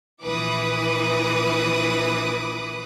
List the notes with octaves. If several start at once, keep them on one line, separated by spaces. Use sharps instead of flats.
A#1 E3 B4 D6 D#6 F#6